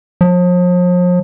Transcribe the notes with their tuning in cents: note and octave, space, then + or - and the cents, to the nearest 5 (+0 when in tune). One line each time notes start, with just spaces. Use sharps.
F3 +40